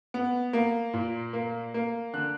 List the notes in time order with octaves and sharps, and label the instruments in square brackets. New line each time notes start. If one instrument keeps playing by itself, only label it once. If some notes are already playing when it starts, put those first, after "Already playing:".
[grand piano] B3
A#3
A#2
A#3
A#3
D3 F#6